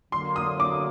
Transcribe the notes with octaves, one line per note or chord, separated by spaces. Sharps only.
D3 F#3 A#3 C6
D#6
D6